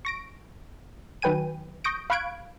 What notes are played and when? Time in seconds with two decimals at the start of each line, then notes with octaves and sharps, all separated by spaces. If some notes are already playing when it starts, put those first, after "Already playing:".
0.05 C#6 A#6 D7
1.22 D#3 F#3 B4 G5 G#5 D#7
1.84 C#6 D#6 G6 A#6 D7
2.10 F5 B5 C#6 F#6 G#6 D7